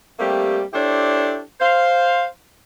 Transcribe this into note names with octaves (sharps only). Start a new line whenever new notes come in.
G3 A3 A#3 C4 G4
D4 E4 G4 A4 C5 C#5
C5 F5